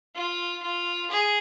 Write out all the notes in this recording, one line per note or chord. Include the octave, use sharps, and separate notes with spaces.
F4
F4
G#4